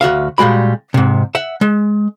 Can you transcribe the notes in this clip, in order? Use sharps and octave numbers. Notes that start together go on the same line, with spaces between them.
D2 F#4 E5 F5
A#2 G3 G#3 F#4 B5
G#2 C3
E5 F#5
G#3